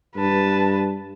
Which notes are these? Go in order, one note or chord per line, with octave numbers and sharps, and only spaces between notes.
G2 B4 A5